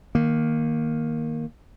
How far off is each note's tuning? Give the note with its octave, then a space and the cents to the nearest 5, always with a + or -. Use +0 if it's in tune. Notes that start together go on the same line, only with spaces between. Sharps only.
D#3 +0 A#3 +0